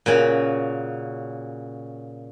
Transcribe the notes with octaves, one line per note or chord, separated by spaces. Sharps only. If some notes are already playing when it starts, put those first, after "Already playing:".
A#2 C#3 C#4 F#4